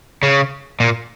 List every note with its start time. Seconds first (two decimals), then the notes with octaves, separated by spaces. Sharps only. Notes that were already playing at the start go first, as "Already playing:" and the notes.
0.23 C#3
0.80 A#2